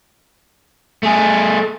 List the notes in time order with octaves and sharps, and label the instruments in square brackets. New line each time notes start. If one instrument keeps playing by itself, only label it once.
[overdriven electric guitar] A3 G#4